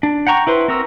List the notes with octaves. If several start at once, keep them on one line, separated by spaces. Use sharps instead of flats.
D4
F#5 G5 A#5 C#6
E4 B4 C5
C4 F#4 A#4 E6